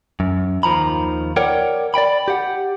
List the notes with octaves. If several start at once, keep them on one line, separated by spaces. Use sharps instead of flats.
F#2
D#2 D#3 F3 A#5 B5
A#4 C#5 D5 F#5 G5
D5 D#5 G5 B5
G4 F#5